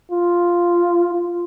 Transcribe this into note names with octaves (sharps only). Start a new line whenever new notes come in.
F4
F4